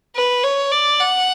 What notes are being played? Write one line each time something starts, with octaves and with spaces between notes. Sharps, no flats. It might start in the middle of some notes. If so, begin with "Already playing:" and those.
B4
C#5
D5
F#5